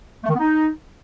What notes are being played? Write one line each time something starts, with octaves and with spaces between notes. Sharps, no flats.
A3
D#3
B3
D#4